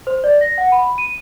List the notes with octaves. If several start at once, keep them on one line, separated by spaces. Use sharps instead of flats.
C5
D5
A#6
F#5
B5
D#7